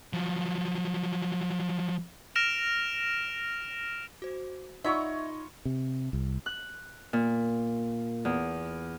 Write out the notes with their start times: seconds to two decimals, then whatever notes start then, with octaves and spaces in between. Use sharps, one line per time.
0.13 F3 F#3
2.35 F6 A#6 D7 E7 F7
4.22 F#4 C5
4.84 D#4 F4 C#5 D5 E5 F#5 B5 C#6
5.65 C3
6.13 C2
6.46 F#6
7.13 A#2
8.25 E2